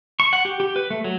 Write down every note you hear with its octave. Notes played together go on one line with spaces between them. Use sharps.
C#6
F#5
G4
G4
B4
A3
F#3